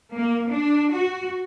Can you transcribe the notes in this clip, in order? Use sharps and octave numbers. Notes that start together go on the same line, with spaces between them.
A#3
D4
F#4